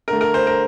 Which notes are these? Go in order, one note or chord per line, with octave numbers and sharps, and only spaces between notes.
D3 A3 A#4
A#4
C5
A#4